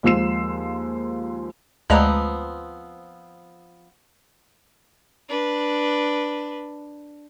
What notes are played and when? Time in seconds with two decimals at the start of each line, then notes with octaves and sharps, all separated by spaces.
0.03 D#2 F3 G#3 E6 C7 E7
1.90 D2 F3 G#3 B3 C4 A#5
5.29 D4 B4